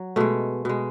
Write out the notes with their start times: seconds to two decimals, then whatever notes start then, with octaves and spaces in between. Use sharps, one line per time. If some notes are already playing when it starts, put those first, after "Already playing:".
Already playing: F#3
0.16 B2 G#3 A3
0.65 B2 G#3